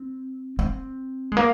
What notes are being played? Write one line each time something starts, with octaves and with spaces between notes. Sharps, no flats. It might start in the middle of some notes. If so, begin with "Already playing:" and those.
Already playing: C4
C4
G#3
A#3